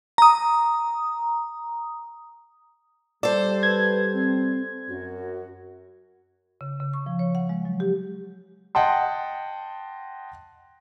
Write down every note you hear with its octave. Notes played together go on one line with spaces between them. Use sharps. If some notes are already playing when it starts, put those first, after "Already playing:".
A#5 D#6
G3 A4 C5 D5
B4 G#6
C4
F#2 F#4
C#3
C#3
C#6
F3
C#5
F#5
G#3
F#3
G4
D#5 F#5 G5 A5 C6